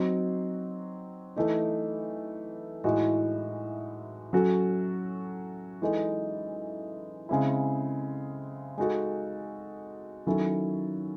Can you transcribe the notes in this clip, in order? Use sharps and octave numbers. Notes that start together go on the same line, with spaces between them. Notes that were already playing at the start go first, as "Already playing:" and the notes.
Already playing: F#3 C4 D#4 F#4
E3 A3 D#4
A2 E3 G#3 D#4 F#4
F#3 C#4 F#4 A4
E3 G#3 D#4 A4
C#3 G#3 C4 E4
G#3 D#4 F#4 A4
D#3 F#3 C#4 E4 A4